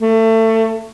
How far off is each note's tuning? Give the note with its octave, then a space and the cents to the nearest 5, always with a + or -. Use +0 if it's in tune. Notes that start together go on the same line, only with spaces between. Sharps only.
A3 +25